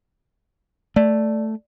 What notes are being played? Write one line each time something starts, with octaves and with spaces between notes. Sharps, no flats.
A3 D5